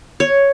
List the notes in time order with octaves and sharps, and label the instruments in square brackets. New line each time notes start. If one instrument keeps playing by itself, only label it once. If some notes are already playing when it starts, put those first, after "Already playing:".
[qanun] C#5